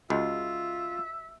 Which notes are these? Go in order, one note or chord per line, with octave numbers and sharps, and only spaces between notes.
C#2 F4 F#4 D#5 E5 F#5